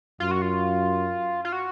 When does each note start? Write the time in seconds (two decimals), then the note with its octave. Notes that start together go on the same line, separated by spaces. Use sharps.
0.20 F#2 F4
0.31 F#4
0.42 F4
1.45 F4
1.53 F#4